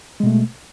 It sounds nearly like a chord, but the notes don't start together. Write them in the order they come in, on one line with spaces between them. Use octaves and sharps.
G#3 B2 A3